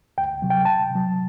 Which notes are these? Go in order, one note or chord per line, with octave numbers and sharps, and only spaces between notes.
D2 G5
C3 F#3
G5
C2 A5
C3
F#3